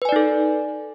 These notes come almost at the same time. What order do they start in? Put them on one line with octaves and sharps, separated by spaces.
B4 G#5 D5 D#4 A4